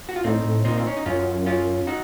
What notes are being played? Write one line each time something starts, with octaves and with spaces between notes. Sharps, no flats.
F#4
F4
A2 C4 D#4
A2
A#2 C4 D#4
C4
C#4
D#4
F#2 C#4 F4
C#4 F4
D#4 F#4